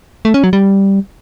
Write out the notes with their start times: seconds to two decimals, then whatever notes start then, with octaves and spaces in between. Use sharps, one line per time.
0.25 A3
0.34 C#4
0.44 F#3
0.53 G3